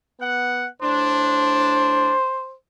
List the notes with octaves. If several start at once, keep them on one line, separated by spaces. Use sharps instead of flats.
B3 F#5
A2 D4 C5